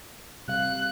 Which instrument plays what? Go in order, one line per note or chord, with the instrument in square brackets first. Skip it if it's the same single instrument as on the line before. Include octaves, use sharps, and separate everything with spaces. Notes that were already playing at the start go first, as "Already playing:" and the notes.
[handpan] C3 G3 F5 [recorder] F#6